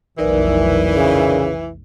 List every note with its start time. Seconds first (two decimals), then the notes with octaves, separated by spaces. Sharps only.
0.18 F1 B1 E3 D#4 A#4 D5
0.96 C#3